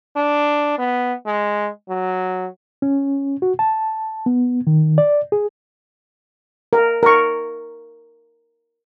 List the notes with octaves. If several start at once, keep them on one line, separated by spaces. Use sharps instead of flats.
D4
B3
G#3
F#3
C#4
F#4
A5
B3
D#3
D5
G#4
A#4
A#4 C#6